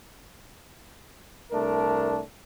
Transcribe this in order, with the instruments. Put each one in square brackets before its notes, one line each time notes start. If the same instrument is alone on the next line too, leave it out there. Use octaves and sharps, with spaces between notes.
[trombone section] C2 A3 D4 A#4